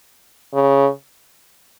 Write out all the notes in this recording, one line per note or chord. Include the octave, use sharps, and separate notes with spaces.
C#3